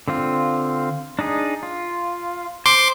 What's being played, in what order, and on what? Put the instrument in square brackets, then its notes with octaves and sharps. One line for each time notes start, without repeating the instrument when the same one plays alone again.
[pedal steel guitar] D3 C4 F4
D4 D#4 G#4
F4
[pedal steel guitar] C5 [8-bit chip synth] C6 D6